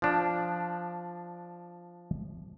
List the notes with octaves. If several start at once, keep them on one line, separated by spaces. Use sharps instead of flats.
F3 D4